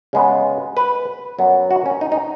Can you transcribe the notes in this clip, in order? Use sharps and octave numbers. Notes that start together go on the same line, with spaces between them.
C#3 G#3 B3
B4
F#2 F#3 B3
F#4
C#4
D#4
D#4